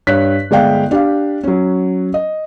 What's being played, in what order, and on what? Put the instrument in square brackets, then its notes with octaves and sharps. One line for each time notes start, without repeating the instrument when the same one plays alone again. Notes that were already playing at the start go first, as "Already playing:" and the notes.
[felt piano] G2 C#5 F#6 B6
G1 G#3 D5 F5 G5
D4 G4 F5
F#3 C#4
D#5